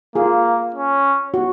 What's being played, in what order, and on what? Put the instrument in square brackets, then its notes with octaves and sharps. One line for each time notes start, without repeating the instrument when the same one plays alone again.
[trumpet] A#3 [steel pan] F4 G#4
[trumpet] C#4
[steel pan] F#4